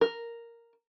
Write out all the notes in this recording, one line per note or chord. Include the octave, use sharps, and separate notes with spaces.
A#4